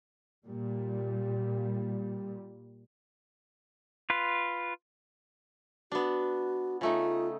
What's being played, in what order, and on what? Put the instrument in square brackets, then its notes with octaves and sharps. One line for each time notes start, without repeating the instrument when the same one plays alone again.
[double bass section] A#2 G3
[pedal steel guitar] F4 B4
[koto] B3 D4 [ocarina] F#4
[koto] C#3 A3 D#4 [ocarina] F4